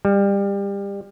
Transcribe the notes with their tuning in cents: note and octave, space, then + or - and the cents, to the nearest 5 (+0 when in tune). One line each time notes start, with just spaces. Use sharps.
G3 +25